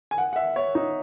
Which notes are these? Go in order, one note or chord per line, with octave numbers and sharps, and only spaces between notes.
G#5
F#5
F#5
E5
C#5
D#4